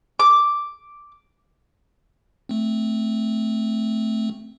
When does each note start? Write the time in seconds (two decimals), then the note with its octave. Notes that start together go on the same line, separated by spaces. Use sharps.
0.19 D6
2.49 A3 C4